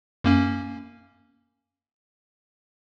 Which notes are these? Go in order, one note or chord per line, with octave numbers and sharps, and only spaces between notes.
F#2 A#3 C#4